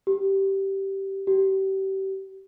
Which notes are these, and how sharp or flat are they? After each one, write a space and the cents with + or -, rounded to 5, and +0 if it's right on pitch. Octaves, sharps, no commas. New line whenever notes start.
G4 -10
G4 -30